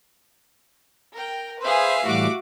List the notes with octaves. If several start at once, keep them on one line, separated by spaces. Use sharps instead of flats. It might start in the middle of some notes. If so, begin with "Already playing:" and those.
A#4 G5
G#4 B4 C5 E5 F5
A2 E3 G3 F#4 D6 D7